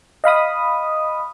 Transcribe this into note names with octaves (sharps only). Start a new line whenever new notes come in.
D#5 F5 B5 D#6